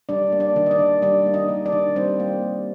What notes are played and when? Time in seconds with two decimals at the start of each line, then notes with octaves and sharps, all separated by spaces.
0.09 G3 D4 D5
0.32 A#3
0.40 D4 D5
0.56 D#3
0.66 D#5
0.71 D4 D5
0.79 D#3
1.02 G3 D4 D5
1.26 A#3
1.34 D#4 D#5
1.49 D#3
1.65 D4 D5
1.72 D#3
1.96 G3 C4 C5
2.20 A#3